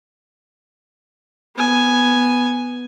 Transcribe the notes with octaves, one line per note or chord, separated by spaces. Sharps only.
B3 G#5